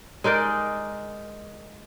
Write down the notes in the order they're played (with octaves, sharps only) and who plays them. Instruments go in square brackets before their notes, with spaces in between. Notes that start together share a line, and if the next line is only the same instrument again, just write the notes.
[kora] G#3 D#4 A#4 D5